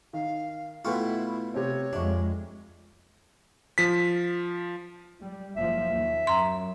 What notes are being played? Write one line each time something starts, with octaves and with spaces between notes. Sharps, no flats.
D#3 F5
B2 A3 E4 F4 F#5 G5 C#6
C3 C4 C#5
F2 G#3 D4 E5 C#6
F3 B6
G3
F#1 F3 E5
D#2
F#2 A#5 C6